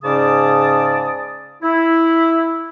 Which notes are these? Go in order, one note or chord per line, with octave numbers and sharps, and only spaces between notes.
G#2 C#3 C#4 D5 A5 D#6
E4